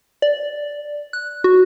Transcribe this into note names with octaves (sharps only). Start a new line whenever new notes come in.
D5
F#6
F#4